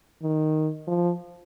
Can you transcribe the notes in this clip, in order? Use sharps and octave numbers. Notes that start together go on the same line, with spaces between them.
D#3
F3